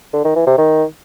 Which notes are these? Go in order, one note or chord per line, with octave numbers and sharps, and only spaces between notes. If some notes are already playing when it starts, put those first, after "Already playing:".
D3
D#3
E3
C3
D#3